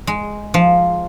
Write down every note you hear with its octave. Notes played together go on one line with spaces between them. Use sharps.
G#3
F3